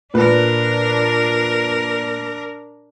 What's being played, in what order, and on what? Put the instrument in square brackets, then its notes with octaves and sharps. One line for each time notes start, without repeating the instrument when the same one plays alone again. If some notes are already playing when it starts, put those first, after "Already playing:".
[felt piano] A#2 B4 [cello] D4 A#4